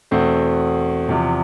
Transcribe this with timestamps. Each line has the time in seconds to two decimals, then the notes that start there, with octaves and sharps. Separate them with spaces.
0.11 E2 B2 A3 C4
1.09 E2 C3 F3